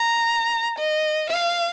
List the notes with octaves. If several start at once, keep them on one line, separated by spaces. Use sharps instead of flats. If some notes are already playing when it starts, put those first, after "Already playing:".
Already playing: A#5
D#5
F5